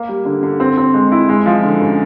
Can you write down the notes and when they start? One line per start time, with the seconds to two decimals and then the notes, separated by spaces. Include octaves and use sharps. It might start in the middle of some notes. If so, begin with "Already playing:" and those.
Already playing: A#3
0.09 G3
0.25 D3
0.43 D3
0.60 C4
0.77 C4
0.94 G#3
1.12 E4
1.29 G#3
1.46 F3
1.63 D3
1.80 F#2